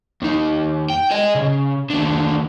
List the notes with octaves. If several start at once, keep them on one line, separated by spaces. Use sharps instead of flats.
D#2 D#4
G5
G#4 D#5
C#3
D#2 D3